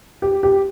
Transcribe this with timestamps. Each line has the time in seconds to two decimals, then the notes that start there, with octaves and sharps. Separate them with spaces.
0.22 G4
0.43 G4